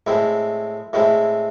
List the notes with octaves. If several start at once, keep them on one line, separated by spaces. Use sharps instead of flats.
A2 G#3 C4 E4
A2 G#3 C4 E4